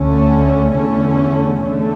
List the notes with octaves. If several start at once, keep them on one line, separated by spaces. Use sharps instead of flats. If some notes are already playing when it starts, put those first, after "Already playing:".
Already playing: D2 D3 A3 C#4
E2 D3 A3 C#4
D3 A3